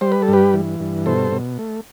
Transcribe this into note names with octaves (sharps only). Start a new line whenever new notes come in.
G3 C5
B4
A4
G2
G4 B4
E3
G2
B2 A4 C5
B2
A3